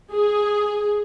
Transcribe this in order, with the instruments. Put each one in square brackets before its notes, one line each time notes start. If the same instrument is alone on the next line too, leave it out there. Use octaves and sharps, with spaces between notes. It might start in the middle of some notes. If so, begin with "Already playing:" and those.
[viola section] G#4